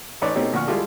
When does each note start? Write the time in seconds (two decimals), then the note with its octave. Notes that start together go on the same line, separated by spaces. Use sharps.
0.21 A1 D#4 B4 C#5 D5
0.35 B2 A3 C4 C#4 D#4 G4
0.53 D2 A#2 F3 F#5 C#6 F6
0.67 G3 G#3 E4 F4 G4 A4